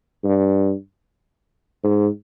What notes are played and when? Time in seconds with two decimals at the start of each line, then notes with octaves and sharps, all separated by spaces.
0.24 G2
1.84 G#2